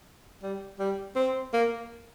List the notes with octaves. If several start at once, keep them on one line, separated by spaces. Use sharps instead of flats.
G3
G3
C4
A#3